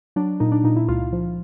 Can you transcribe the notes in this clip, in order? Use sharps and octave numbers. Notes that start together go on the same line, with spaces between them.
F#3 D4
A#2 D#4
D4
A#2 D#4
E4
C#2 F4
F3